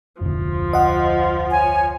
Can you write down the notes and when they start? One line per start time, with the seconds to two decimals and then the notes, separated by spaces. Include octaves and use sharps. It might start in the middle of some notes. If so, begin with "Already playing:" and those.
0.21 F1 D2 F3
0.73 D#5 F#5
1.50 C#5 G#5